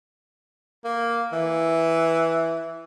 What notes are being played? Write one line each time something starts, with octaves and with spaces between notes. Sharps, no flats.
A#3
E3